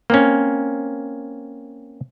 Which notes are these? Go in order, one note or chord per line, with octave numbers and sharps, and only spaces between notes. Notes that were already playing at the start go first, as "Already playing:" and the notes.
A#3 C4 C#4